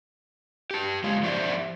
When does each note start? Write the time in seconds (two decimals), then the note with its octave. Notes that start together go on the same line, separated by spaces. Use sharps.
0.71 G4 A5
1.03 F#2 G#3 F4
1.23 F3 G4 C5 D5 E5